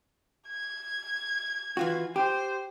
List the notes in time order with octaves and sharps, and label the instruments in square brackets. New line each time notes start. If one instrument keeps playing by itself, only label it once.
[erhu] G#6
[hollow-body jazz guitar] E3 F4 F#4
[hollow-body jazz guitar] G4 [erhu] C5